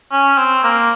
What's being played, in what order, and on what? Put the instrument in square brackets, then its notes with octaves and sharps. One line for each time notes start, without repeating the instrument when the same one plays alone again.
[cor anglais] C#4
C4
A#3